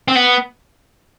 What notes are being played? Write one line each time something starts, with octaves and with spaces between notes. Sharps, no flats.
C4
B3